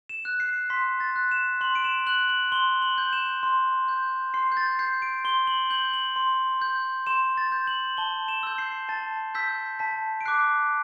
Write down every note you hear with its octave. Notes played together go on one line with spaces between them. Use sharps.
E7
F#6
C7
C6 B6
A6
F#6
E7
C6 F#7
D7
E7
F#6 F#7
F#7
C6 G7
F#7
G6
E7
C6
G6
C6 C7
G6
A6
G6 C7
D7
C6 G7
F#7
G6 F#7
F#7
C6
G6
C6 E7
A6
G6
F#7
A5 G7
E7
E6 G6
C7
A5 A6
E6 G6 B6
A5 B6
D7
D6 F#6 C7